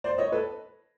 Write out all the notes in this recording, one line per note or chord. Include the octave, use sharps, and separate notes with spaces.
C5 D5
C#5 D#5
A4 B4